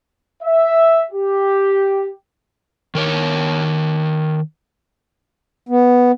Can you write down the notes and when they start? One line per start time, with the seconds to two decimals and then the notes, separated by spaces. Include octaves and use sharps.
0.43 E5
1.11 G4
2.95 D#3 A#4 C#5
5.69 B3